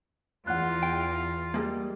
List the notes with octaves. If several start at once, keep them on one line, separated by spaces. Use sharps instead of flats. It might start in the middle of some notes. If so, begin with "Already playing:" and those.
E2 F4 F#5 F#6
G5
G3 G#3 A#3